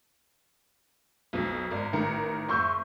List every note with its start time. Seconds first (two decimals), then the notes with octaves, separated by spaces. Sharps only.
1.33 B1 F2 B2
1.71 G#1 A#4 D5
1.93 A1 D#3 A#4 C#7
2.49 F#1 C6 C#6 E6 G6